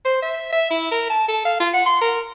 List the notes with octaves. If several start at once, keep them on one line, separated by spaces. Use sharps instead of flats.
C5
E5
E5
E4
A#4
A5
A4
F5
F4
F#5
C6
A#4